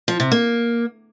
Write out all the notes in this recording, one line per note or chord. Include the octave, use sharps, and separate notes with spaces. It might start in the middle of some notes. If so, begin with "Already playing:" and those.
F3
C3
A#3